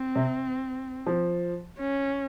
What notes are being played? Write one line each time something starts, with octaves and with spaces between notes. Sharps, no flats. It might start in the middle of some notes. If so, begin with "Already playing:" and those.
Already playing: C4
C3
F3
C#4